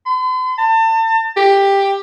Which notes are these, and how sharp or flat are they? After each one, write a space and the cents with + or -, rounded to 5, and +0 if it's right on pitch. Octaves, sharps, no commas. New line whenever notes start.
C6 -45
A5 +35
G4 +10